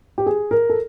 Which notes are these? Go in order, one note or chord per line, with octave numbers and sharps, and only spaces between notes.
G4
G#4
A#4
A4